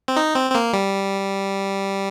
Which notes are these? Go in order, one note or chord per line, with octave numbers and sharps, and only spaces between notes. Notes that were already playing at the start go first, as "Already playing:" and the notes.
C4
D#4
C4
C4
A#3
G3